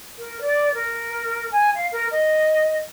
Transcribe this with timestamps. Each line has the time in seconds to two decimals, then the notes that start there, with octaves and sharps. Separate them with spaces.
0.19 A#4
0.41 D5
0.74 A#4
1.52 G#5
1.75 F5
1.92 A#4
2.11 D#5